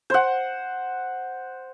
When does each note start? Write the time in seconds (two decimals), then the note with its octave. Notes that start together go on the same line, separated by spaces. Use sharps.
0.10 C5 F#5